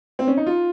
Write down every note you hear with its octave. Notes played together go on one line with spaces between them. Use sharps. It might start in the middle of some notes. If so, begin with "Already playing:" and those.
C4
C#4
D#4
F4